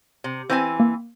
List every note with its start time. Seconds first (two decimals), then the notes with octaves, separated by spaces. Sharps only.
0.24 C3
0.50 E3 C4 C5 G#5 G6
0.80 A#3